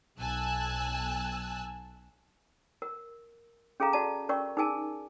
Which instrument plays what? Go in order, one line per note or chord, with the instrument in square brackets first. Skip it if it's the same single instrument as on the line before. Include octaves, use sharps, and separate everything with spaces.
[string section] B1 G#5 A5 E6 F#6
[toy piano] A#4
C#4 G#4 A4 F5 A#5
F#4 D5 A5
C#4 A#4 D5 C#6
D#4 G#4 A#4 G#5 A5